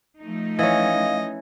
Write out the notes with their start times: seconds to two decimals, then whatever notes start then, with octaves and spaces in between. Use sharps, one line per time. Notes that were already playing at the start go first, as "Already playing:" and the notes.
0.20 F3 A3 D#4
0.59 E3 C#4 D#5 F5